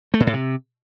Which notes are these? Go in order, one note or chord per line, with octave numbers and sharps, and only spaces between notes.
A3
A#2
A2
C3